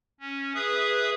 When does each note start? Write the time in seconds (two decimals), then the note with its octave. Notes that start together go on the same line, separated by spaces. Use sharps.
0.20 C#4
0.55 G#4 B4 E5 D#6